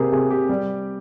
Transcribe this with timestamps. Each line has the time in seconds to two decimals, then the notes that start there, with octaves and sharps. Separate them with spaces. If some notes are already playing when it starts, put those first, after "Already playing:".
Already playing: C3 A#3 G4 G#4 A#4
0.12 C3 G#4
0.30 G4
0.49 G3